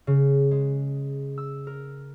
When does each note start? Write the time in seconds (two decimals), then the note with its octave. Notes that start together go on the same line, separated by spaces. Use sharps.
0.07 C#3
0.51 G#3
1.38 E6
1.67 A#4